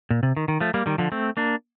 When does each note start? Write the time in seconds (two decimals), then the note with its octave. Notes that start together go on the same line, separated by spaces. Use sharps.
0.10 A#2
0.23 C3
0.37 D#3
0.48 D#3
0.61 F3 A3
0.74 G3 A#3
0.86 D#3 G3
0.98 D3 F3
1.12 A3 C4
1.37 A#3 D4